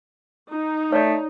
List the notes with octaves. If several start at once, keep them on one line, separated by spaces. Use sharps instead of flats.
D#4
A3 C#5 D5